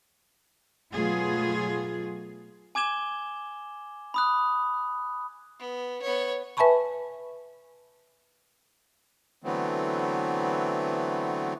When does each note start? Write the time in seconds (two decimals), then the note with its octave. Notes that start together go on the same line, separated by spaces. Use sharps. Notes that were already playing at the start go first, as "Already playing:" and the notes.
0.93 B2 F#3 A3 F4 G#4
2.75 G#5 D6 G#6 E7 G7
4.14 B5 D#6 F#6
5.59 B3
6.02 B3 C#5
6.57 B4 E5 G#5 A5 B5 C#6
9.44 D3 E3 F#3 A3 B3 C4